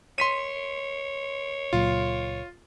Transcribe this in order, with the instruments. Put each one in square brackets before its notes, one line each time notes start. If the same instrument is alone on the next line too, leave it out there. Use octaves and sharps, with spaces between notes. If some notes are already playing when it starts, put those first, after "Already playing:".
[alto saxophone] C#5 [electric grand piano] C6 B6 D#7
[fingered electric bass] C#2 A#2 F#3 [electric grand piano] F4